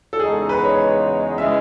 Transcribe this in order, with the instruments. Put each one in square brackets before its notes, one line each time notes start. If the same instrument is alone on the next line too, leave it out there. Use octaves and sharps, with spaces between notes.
[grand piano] A4
[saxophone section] E2 C#3 G#3 D#4 F#4 [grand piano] G#4
[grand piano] B4
C#5
[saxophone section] C#3 E3 G#3 [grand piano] E5